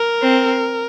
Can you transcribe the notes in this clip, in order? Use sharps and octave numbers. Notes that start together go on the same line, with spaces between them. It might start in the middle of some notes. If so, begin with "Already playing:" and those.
Already playing: A#4
C4